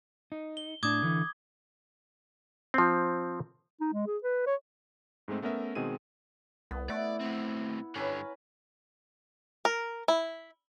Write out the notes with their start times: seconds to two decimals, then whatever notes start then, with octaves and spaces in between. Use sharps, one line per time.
0.32 D#4
0.57 G7
0.83 A2 D4 D6 D#6 G#6
1.03 D3 E3
2.74 F3 C4
3.81 D#4
3.93 G#3
4.07 G#4
4.23 B4
4.47 C#5
5.28 G#2 G#3 A3 C4
5.42 A3 B3 C#4 A#4 E5
5.75 B2 D#3 G#3 C4 G#4 D#7
6.71 C2 B3
6.90 A3 E4 D5 F#5
7.20 A2 C4
7.95 G2 D3 C#4 B4 A#5
9.65 A#4
10.08 E4